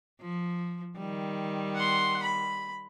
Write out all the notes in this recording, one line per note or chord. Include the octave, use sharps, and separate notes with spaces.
F3
D#3 G3
F#5 C6
B5